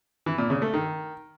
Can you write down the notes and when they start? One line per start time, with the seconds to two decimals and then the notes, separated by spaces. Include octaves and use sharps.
0.26 E3
0.38 A#2
0.50 C#3
0.62 A3
0.74 D#3